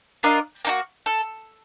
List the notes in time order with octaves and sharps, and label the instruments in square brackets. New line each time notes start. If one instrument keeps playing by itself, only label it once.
[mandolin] D4 F4 A#4 D#5
A#3 D#4 F#4
A4